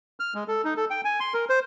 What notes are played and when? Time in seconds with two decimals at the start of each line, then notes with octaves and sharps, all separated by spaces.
0.20 F6
0.34 G#3
0.48 A4
0.65 D#4
0.77 A4
0.90 G5
1.05 G#5
1.20 C6
1.34 A#4
1.49 C5